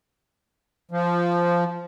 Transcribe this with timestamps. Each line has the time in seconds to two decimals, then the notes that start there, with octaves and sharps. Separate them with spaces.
0.91 F3